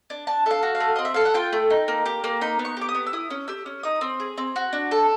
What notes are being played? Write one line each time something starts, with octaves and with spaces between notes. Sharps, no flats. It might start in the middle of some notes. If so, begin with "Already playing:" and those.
D4
D4 A5
A4 E5 F5
F#4
F5
A3
C4 D#5
E5
A4 F5
F#5
F4 G5
A3
D#4
A#3
G4
A#3
D#4 B5
B3
C#6
G4 D6
D#6
B3
E6
E4 D#6
C#4
G4 E6
C#4
D#4 D#6
C4
G#4
C4
F#4
D4
A4